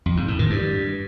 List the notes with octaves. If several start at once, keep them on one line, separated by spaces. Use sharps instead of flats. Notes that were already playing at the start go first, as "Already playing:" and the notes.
F2
G#2
A2
D#3
G2